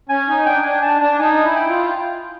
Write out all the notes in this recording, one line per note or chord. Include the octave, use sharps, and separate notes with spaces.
C#4 G#5
D#4
D4 G5
D4 G#5
D4 A5
D4 A5
D#4 G#5
E4
G5
F4